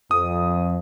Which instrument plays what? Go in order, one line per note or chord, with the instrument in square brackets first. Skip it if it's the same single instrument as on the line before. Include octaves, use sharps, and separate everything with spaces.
[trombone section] F2 [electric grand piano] D#6